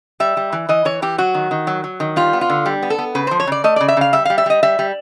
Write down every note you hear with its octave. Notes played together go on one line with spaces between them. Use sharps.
G3 E5
G3
E3
E3 D#5
E3 C#5
E3 G4
F#3 F#4
D#3
D#3
F#3
F#3
D#3
G3 F4
B3
F4
D3
G3
B3
A4
B3
C#3 B4
F3 C5
C#5
C#3 D5
A3 D#5
C#3 D5
E5
C#3 F5
G3 E5
G3 F5
E5
G3 D#5
G3 E5
G3